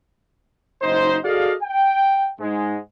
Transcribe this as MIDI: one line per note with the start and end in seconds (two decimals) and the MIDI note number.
0.82 1.17 30
0.82 1.17 63
0.82 1.17 72
1.24 1.53 66
1.24 1.53 68
1.24 1.53 69
1.24 1.53 74
1.24 1.53 75
1.24 1.53 77
1.62 2.27 79
2.40 2.77 44
2.40 2.77 56